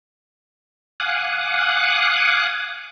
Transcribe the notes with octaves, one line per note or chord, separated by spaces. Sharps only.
F5 F#5 G#5 D6 D#6 F#6